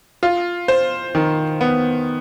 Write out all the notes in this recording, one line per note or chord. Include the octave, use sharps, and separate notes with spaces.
F4
C5
D#3
B3